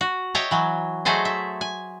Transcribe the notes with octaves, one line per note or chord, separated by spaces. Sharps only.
F#4
C#5 D#5 E5 G5 A5 A#5
E3 F#3
F#3 A3 G#4 A4 C5 D#5
E5
G#5